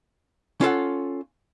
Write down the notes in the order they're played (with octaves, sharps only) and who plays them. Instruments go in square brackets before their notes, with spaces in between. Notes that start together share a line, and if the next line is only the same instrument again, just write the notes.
[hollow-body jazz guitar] C#4 F4 A4 F#5